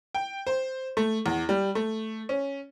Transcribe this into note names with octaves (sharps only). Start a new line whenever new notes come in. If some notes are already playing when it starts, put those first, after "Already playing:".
G5
C5
A3
E2
G3
A3
C#4